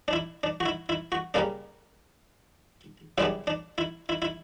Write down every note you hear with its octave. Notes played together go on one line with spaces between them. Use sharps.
D4
E4
D4
F#4
E4
E4
F#4
C#3 G3 A#3 D4
F#2 C#3 G3 B3 D4 E4
D4
E4
E4
E4